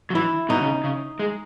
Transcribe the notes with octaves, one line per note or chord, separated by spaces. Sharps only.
F#3
E3 E4
B2 D#4
C#3
C#3
G#3